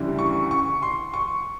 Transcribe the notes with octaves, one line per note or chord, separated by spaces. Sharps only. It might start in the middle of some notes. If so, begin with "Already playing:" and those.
Already playing: D2 C#3 E3 G3
C#6
C#6
C6
C#6